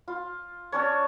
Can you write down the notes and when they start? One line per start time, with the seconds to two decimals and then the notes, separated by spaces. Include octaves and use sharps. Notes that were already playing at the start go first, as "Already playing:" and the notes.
0.08 F4
0.72 C#4 D4 C#5